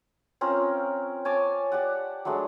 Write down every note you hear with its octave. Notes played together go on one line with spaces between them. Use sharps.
C4 C#4 F4 A#4
C#5 G#5 A5 D6
G4 D5 F#5
F#3 G#3 A3 D4